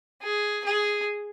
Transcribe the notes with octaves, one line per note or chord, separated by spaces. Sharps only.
G#4
G#4